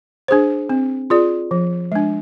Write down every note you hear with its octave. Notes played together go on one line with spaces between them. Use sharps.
D4 G#4 C5
C4
F4 G#4 D5
F3
G#3 D4